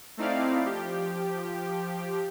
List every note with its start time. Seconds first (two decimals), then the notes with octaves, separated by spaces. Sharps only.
0.17 A3 C4 D#4 E4 D5 F5
0.65 F3 G4